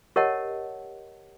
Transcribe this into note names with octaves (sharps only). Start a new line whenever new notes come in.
G4 A#4 C#5 D#5 F#5 A5